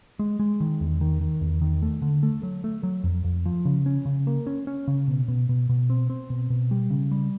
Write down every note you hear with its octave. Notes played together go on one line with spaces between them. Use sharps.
G#3
G#3
D#3
E2
D#3
D#3
E2
D#3
A3
D3
A3
F#3
A3
F#3
F2
F2
F3
C#3
C#4
C#3
A#3
C#4
C#4
C#3
B2
B2
B2
B2
C4
C4
B2
B2
G3
C#3
G3